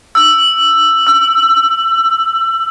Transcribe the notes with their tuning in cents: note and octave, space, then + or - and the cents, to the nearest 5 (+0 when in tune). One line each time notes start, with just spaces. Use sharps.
E6 +10
E6 +25